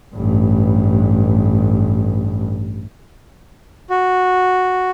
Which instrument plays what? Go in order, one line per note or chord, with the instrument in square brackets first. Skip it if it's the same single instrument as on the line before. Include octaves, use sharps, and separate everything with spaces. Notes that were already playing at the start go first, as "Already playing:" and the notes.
[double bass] A1 G2
[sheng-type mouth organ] F#4